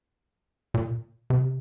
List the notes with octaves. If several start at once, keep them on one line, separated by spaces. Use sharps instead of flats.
A#2
C3